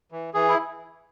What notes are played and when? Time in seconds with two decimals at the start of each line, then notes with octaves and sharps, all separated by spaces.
0.12 E3
0.34 E3 G#4
0.49 E4